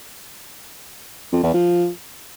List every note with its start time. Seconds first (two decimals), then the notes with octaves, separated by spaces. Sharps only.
1.32 F2
1.43 E2
1.54 F3